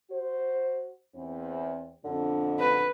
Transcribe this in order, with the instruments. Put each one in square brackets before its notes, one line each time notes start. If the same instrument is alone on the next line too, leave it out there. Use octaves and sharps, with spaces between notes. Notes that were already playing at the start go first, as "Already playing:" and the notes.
[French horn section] F#4 C5
E2 C4
[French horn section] F2 B2 D4 [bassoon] D3
[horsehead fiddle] B4